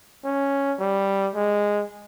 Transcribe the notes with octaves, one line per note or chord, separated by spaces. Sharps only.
C#4
G3
G#3